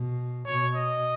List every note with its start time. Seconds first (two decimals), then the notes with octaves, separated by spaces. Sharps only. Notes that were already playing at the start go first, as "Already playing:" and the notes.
Already playing: B2
0.46 B2 C#5
0.75 D#5